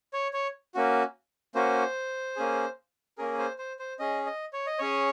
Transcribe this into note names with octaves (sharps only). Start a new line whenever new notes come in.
C#5
C#5
A#3 C#4 F#4
A#3 C#4 F#4 C5
A#3 C#4 G#4
A#3 C#4 G#4 A#4
C5
C5
C5
C#4 G#4 D#5
D#5
C#5
D#5
C#4 G#4 C#5